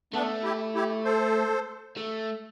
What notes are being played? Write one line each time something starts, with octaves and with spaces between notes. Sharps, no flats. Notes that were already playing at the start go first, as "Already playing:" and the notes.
A3 B3 D4
E4 G4
E4 G4
A4 C5
A3